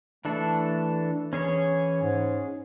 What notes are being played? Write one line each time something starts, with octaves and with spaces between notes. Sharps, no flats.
E3 A3 D4 A4
E3 C#4 G#4 C#5
G#2